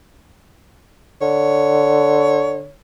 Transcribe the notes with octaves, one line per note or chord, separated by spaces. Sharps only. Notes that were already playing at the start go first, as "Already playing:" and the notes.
D3 C#5